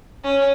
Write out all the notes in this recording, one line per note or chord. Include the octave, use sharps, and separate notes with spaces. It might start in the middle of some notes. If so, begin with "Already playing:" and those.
C#4